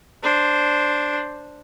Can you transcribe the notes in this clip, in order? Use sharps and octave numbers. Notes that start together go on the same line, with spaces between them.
D4 C5